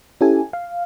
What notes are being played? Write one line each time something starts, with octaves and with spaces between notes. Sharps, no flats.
C#4 E4 G4 A4 G#5
F5